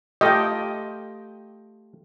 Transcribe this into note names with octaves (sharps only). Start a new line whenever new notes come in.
A3 F4 G4 D#5 G5